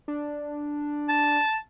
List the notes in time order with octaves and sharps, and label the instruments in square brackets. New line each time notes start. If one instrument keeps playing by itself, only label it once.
[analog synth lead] D4
[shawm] A5